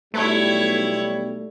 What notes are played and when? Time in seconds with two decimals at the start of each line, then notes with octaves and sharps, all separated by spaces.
0.14 B1 G3 A3 E4 C#5